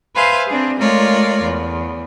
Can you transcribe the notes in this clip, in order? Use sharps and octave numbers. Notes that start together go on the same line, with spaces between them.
B4 C5 E5 F5 G#5
C4 D4 G#4
G#3 A3 F4 A#4 C#5 D5
E2